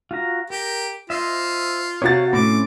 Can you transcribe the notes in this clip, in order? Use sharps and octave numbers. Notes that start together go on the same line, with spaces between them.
F4 F#4 A#5
G4 A#4
F4 C5 D#5 E5
C3 F#4 C#5 F5 F#5 A6
A2 C4 C#4 D6